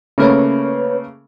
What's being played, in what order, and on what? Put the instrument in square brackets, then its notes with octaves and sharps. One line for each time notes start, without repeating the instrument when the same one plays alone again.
[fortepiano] C#3 A3 A#3 [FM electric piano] C#4 B4 C#5